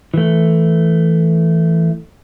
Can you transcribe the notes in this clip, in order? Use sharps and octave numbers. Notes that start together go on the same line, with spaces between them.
E3 A3